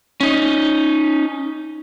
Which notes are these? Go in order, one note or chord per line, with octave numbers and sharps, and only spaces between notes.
C#4 D#4